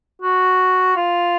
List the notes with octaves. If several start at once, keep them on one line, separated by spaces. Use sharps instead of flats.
F#4
F4